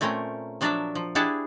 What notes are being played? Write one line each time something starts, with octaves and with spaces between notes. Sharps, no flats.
A#2 A3 C4 C#4 A#4
F3 F#3 D4 A#4 D5 E5
F3
D4 E4 G4 G#4 F#5 A5